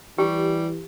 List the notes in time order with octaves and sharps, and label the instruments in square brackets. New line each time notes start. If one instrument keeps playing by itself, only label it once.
[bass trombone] E3 [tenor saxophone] G3 [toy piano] G4